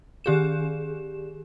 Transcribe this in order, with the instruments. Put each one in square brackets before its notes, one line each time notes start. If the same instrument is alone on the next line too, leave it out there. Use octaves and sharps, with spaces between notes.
[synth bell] D#3 G4 G#4 E7